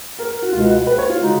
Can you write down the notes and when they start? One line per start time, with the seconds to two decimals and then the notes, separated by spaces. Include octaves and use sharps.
0.19 A#4
0.31 A#4
0.42 F#4
0.52 C#2 B2 G#3 F4
0.64 F#4
0.87 B4
0.98 C#5
1.09 F4
1.21 C#3 G#3 D#4 F#4